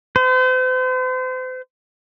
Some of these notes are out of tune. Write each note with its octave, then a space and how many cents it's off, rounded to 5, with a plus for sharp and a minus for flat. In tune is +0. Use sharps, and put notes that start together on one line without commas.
C5 -40